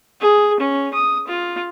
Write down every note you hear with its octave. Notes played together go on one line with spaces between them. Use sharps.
G#4
C#4
D#6
F4